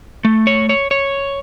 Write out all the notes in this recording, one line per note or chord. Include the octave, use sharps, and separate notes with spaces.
A3
C#5
C#5
C#5